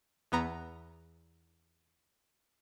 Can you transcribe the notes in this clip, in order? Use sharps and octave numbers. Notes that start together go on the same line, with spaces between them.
E2 B3 A#5